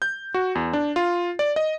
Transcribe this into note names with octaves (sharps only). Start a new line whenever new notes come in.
G6
F#4
E2
D4
F4
D5
D#5